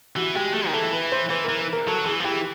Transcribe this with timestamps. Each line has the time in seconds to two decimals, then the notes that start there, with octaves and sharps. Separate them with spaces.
0.16 E3 F#4
0.35 G#3 G4
0.54 A3 G#4
0.67 D#3
0.73 E3 A4
0.93 B4
1.12 C5
1.30 E3 B4
1.44 E3 A#4
1.59 B4
1.73 A#4
1.87 F#3 A4
2.06 E3 G#4
2.20 F3
2.24 E3 G4